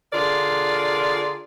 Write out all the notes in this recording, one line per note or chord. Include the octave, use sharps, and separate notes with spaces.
D3 F4 G#4 A#4 D5